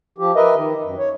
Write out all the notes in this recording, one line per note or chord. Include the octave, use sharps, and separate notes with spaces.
F3 G4
A#4 B4 D#5 E5
D#3
F#2
C#5